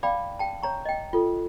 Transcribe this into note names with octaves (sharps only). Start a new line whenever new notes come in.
D5 F5 G5 A5 B5 D6
G5 A5
C#5 A#5 C#6
D#5 G5
F4 A4